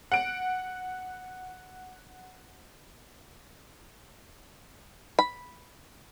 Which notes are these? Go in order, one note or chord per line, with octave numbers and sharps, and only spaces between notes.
F#5 D7
B5